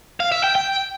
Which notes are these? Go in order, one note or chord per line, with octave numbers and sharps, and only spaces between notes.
F5
E5
G5
G5